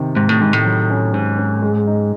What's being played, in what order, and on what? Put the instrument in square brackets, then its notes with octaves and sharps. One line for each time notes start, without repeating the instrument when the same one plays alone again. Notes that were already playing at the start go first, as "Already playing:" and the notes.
Already playing: [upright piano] C3 D#3
[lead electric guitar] G#2 [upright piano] C3
[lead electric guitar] A2
[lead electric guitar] G#2 [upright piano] D#3
[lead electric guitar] A2
[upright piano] F#3
C#4
[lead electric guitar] G#2 [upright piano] C#4
[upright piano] C#4
G#3
D#4